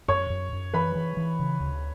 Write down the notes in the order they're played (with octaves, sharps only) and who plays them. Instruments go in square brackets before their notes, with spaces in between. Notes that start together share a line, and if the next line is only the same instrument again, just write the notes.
[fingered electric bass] F#2 [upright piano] C#5 C#6
[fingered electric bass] F#2
F#2
[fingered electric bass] E3 [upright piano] B4 B5
[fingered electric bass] E3
E3
C#3
D2